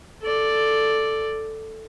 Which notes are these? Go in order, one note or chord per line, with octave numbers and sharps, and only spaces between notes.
A4 D5